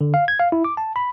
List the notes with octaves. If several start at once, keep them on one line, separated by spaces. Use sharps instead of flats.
D3
F5
G#6
F5
E4
D6
A5
B5